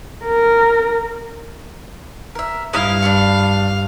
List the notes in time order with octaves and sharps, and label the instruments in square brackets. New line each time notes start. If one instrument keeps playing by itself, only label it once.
[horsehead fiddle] A#4
[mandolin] A#4 E5
[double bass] G2 [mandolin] E4 D#5 [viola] F5
[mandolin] D4 B5 C#6